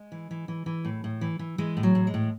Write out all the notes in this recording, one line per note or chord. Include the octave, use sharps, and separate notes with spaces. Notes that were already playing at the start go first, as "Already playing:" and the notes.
Already playing: G#3
E3
E3
E3
E3
A2
A2
E3
E3
E3 G#3
A2
F#3
A2
G#3
A2